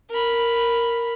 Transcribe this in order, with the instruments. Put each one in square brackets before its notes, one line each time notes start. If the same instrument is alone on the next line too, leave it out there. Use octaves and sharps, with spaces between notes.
[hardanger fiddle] A#4 B5